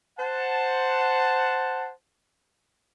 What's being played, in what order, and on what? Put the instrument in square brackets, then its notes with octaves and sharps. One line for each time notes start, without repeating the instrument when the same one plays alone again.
[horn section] C5 F#5 A5